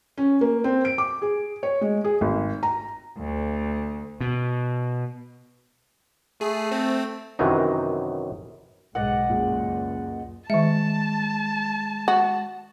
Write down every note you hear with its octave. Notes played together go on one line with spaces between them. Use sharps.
C#4
A#3
C4
D7
D6
G#4
C#5
G#3
G#4
G#1
A#5
D2
B2
A3 G#4
C4
F#2 C3 D#3 E3 F#3 D#4
B1 G#2 G#3 D5 D#5 F#5
C#2 F#2 A#2 G#3
D#3 G#3 E5 A5
F#4